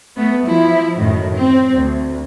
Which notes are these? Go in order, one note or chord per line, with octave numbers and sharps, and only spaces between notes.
A3 B3
F3 E4
F#2 A2 D#3
C4
D2